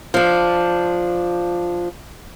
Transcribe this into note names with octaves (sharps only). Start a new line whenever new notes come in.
F3 D4